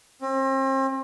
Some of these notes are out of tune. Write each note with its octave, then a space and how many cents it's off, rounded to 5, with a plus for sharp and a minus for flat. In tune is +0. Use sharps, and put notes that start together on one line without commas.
C4 +40